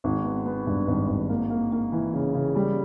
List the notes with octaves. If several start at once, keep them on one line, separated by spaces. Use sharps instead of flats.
G#1
B3
B3
G2
G#1
G#1
A#3
A#3
A#3
E3
C#3
C#3
G3